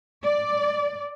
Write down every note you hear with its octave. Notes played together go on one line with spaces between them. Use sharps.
D5